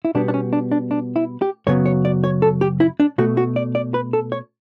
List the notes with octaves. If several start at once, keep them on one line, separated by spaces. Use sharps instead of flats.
E4
B2 G3 B3 D4
D4
C#4
D4
D4
D4
E4
G4
F#2 C#3 F#3 B3 C#5
C#5
D5
C#5
A4
G4
E4
D4
B2 A3 F#4
F#4
D5
D5
B4
A4
C#5